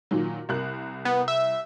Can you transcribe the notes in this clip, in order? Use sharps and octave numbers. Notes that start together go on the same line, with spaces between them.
A#2 D#3 F#3
C2 A#4 F#6
B3
E5